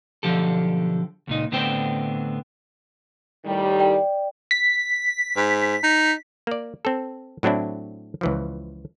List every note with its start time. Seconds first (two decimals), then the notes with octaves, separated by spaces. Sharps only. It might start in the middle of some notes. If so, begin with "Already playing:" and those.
0.23 B1 D3 F3 G4 A4
1.27 C#2 A#2 D#4
1.52 A2 D3 B3 C4 C5 G5
3.45 A2 D#3 G3
3.79 D5 G5
4.51 B6
5.37 G#2
5.84 D#4
6.47 A#3 D5
6.85 C4 A4
7.43 A2 F#3 C4 D4 E4
8.21 C#2 E3 F3